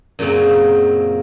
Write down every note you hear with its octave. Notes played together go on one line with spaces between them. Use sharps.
F#2 A#2 C#3 F#3 A#3 C4